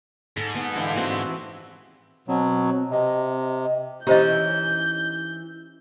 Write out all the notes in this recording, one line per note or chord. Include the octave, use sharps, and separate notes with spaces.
G#2 A4
B3
G2 D3 E3 F5 G5
C4 F#4 B4
D3 E3
B2 F#3 C4
C3 D#5
E3 C#4 D#4 G4 C5 D#5 G6